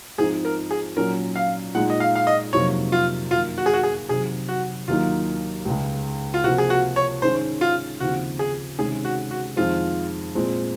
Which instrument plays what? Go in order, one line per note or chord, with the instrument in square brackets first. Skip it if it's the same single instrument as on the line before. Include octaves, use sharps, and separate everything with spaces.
[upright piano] G#2 F3 C4 D#4 [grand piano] G#4
[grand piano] A#4
G#4
[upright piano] A#2 F#3 C#4 [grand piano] A#4
[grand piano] F5
[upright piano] A#2 G#3 D#4 [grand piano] F#5
[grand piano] D#5
F5
F5
D#5
[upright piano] F2 C3 F#3 A#3 D#4 [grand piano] C#5
[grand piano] F4
[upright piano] F#2 D#3 A#3 [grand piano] F4
[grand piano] F#4
G#4
F#4
G#4
[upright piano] C3 D#3 F#3 [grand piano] G#4
[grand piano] F#4
[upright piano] D#2 D#3 F#3 A#3 D#4 [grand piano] F4
[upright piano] C#2 C#3 G#3
[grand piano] F4
[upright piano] C3 F3 A#3 [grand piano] F#4
[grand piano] G#4
F#4
C#5
[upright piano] G#2 D#3 G#3 C#4 [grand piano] C5
[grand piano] F4
[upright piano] D#2 C#3 F3 C4 D#4 [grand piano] F#4
[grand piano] G#4
[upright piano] C3 D#3 G#3 C#4 [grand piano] G#4
[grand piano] F#4
F#4
[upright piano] F2 D#3 G#3 C4 [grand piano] F4
[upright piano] A#2 G#3 C4